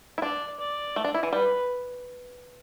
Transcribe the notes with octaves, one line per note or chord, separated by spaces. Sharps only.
E4
D4 D5
D5
A3
D4
E4
E3
G3 B4